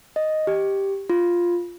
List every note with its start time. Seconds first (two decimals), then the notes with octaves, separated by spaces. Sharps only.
0.16 D#5
0.47 G4
1.10 F4